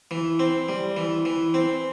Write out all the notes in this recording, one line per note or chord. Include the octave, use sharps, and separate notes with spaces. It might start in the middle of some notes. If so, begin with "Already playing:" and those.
E3
C4
G3
E3
E3
C4